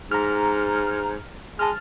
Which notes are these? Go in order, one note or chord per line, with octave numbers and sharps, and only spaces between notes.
G#2 A#5 F6
G#3 A5 F6